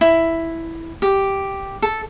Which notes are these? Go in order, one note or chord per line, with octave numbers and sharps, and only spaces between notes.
E4
G4
A4